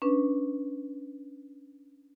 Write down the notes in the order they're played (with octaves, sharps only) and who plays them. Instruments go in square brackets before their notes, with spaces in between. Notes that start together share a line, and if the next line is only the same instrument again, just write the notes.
[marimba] C#4 D4 B4